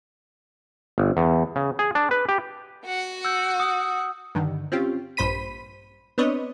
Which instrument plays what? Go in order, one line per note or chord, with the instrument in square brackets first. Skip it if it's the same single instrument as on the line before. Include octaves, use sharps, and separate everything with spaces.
[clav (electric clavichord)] G1
E2
C#3
G#4
D4
B4
G4
[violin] F#4 F#5
[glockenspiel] E6 G6
D#6
[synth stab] G2 D3 D#3
C4 C#4 F4 G4
A#1 G2 C5 B5 B6 D#7
B3 C4 D4 B4 C#5 D#5